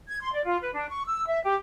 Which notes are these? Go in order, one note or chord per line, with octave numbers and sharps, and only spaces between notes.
G#6
C6
D5
F4
B4
D4
C#6
E6
E5
G4